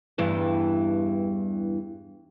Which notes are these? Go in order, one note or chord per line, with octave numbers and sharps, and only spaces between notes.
E2 G2 E3